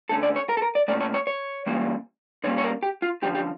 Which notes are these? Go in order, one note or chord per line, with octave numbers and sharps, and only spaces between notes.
D3 A3 C#4 A4
D5
C#5
A#4
A4
A#4
D5
A#2 A3 C#4 D5
C#5
C#5
C#5
E3 G3 A#3 C#4
D3 G3 A#3 C#4 C#5
C#5
A#4
G4
F4
D3 F3 C#4 G4
G4